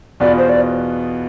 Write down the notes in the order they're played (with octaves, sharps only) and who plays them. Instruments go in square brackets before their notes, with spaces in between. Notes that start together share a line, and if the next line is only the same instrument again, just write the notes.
[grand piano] E2 B2 B3 F4 B4 [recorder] D5
[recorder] C5
D5